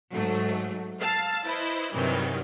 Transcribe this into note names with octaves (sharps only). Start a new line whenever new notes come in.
G#2 F#3 A3
F5 A5 E6 C7
E4 B4 C5 D#5
G2 C3 D#3 E3 F#3 G3